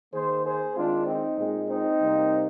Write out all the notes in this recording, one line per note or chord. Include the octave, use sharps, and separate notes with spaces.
D#3 A#3 G#4 C5
G#4 C5
D#3 G#3 C4 D4 F4
C4 D#4
A#2 G#3 C4
C4 D#4
C3 G3 A#3